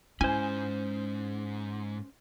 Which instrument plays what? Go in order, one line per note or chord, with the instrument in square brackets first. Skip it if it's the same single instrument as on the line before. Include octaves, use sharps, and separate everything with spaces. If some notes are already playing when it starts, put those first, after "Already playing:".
[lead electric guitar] G#2 [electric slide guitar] C#4 C5 [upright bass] E4 [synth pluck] G#5